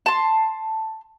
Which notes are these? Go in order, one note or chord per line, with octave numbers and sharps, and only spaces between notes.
A5 C6